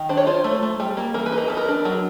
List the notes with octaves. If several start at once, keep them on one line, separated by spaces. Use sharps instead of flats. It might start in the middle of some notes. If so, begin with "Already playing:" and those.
Already playing: D#3
D4 C5
C#5
F4 C5
A3
A3
G3
A#3
E3 A#4
B4
D#4
A#4
B3 A4
A#4
D4
F#3